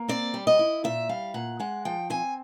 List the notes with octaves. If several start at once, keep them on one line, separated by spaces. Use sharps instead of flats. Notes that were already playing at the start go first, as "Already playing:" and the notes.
Already playing: A#3
C4 D5
G3
D#5
E4
A#2 E5
G3 F5
A#2 F#5
G#3 F#5
F3 G5
C4 G#5